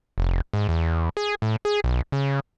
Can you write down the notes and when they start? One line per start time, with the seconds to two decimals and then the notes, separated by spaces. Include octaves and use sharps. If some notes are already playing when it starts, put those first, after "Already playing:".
0.18 F1
0.53 G#2
0.69 E2
1.17 G#4
1.42 A2
1.65 G#4
1.84 B1
2.12 C#3